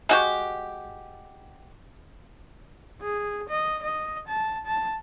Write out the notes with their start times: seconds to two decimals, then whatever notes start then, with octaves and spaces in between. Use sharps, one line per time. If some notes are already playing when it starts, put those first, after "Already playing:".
0.09 G#3 F#4 G4
3.01 G#4
3.49 D#5
3.82 D#5
4.28 A5
4.66 A5